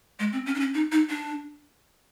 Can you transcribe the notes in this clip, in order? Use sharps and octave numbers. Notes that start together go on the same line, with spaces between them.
G#3
C4
C#4
D4
C#4
D#4
D#4
D4